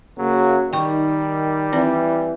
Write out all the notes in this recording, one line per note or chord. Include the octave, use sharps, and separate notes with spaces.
C#3 F#3 A#3 F#4
D#3 G3 G5 C#6
E3 C4 D5